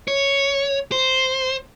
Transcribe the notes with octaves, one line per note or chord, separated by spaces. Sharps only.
C#5
C5